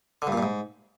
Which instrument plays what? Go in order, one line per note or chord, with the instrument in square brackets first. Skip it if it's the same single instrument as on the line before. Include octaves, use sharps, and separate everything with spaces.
[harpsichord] D3
G2
A#2
G2
G#2